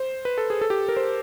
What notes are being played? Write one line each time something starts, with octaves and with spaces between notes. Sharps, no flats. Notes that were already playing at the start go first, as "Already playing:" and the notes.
Already playing: C5
B4
A4
G#4
A4
G4
A#4
C5